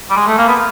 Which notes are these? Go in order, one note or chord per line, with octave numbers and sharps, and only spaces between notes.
G3
G#3
A3
A#3
B3